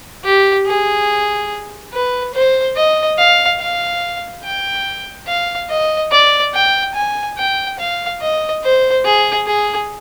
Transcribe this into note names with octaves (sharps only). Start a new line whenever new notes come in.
G4
G#4
B4
C5
D#5
F5
F5
G5
F5
D#5
D5
G5
G#5
G5
F5
D#5
C5
G#4
G#4